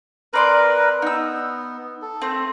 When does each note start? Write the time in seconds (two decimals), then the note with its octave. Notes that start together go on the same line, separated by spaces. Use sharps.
0.33 C4 A#4 B4 D5 C6
1.02 B3 D#4 E6
2.02 A4
2.21 A3 C4